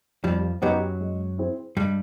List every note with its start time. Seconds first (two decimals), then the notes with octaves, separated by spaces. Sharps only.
0.23 F2 F3 G3
0.62 F#2 F#3 B3 D#4 G4 B4
1.01 G#3
1.38 C4 E4 G#4 C5
1.77 G2 G3 G#3